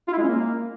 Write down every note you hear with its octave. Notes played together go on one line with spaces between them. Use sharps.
F4
E4
G#3
C#4
A#3